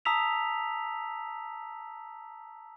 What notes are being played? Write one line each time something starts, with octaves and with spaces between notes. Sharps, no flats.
A5 A#5 D#6 E6 B6 F7